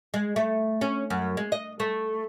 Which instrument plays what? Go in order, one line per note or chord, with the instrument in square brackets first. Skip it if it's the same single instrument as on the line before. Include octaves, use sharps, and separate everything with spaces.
[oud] G#3
A3
C#4
F#2
G#3
D#5
A3